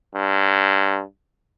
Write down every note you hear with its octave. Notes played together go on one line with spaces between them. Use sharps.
G2